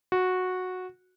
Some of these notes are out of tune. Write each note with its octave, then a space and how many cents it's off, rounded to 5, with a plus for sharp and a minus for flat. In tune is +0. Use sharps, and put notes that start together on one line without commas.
F#4 -10